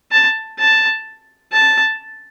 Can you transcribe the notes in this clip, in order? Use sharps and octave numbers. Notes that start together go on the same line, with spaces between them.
A5
A5
A5